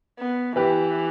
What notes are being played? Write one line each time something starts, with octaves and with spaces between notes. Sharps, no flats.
B3
E3 G4 B4